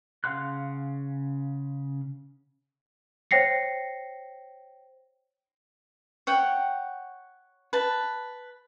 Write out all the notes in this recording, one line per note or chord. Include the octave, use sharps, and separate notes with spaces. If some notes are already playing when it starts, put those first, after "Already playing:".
C#3 F5 F#5 C6 F#6
C5 C#5 G5 A#6 C7 C#7
C#5 F#5 G5
B4 A5